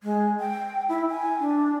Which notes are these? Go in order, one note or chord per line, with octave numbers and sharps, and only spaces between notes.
G#3
G5
E4
G#5
D4